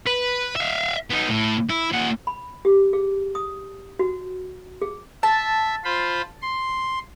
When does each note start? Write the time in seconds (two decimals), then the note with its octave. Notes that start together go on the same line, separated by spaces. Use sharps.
0.07 B4
0.56 E5 F5
1.10 B3 D#4
1.28 A2
1.70 E4
1.92 A#2 F#5
2.27 B5
2.65 G4
2.93 G#4
3.35 D#6
3.99 F#4
4.82 G#4
5.23 E5 A5
5.84 F4 C5 B5
6.42 C6